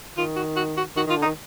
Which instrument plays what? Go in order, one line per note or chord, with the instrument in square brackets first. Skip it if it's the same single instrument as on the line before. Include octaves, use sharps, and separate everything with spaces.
[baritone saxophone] D#3 [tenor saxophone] F4
[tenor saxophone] F#4
F#4
F#4
[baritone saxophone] D#3 [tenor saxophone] F#4
[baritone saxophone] D#3 [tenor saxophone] F4
[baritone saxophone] D3
[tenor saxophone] D#4
[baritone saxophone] D#3